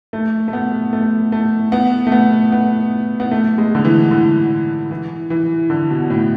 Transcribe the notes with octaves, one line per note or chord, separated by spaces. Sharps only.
A3
A3
B3
A3
A3
B3
A3
B3
B3
B3
A3
G#3
D3
E3
D3
E3
E3
D3
B2
A2